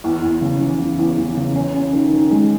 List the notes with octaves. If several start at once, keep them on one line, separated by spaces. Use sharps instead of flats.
E2
E2
C#3
E3
E2
E2
E3
C#3
C#4
C#4
D#3
D#3
G#3